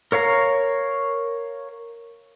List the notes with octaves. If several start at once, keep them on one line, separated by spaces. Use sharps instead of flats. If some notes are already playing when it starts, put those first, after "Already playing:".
A#4 C#5 F5 A#5